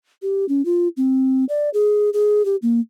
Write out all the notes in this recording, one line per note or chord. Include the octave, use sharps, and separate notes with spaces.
G4
C#4
F4
C4
D5
G#4
G#4
G4
A#3